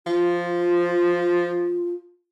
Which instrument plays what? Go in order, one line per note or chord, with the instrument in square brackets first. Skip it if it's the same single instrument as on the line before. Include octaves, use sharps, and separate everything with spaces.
[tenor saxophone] F3 [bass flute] F4